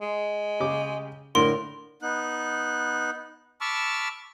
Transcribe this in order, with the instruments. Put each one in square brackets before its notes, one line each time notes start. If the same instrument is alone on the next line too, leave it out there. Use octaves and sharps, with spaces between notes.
[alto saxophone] G#3
[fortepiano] C#3 G4 D6
[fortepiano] A2 D3 [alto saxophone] A#4 [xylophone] C6
[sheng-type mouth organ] B3 D#4 F#6
A5 B5 C#6 D6 E6 F6